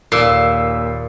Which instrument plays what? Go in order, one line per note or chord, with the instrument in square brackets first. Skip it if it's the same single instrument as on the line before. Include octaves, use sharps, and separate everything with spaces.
[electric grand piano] D#2 E6 C7 [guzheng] A#2